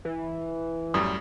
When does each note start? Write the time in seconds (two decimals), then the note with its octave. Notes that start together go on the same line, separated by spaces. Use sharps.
0.05 E3
0.94 F#2 A2 G3 D#6